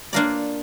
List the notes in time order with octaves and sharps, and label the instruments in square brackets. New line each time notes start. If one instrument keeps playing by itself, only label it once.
[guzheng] A#3 D4 F4 A#4 D5